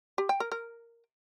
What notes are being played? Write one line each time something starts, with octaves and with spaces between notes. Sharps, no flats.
G4
G5
A#4
A#4